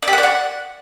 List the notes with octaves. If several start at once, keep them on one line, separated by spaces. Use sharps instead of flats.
D5
G4
F#5
D5
F#5